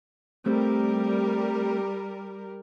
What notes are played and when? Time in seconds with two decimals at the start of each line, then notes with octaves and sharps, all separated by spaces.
0.46 G3 A3 C4 A#4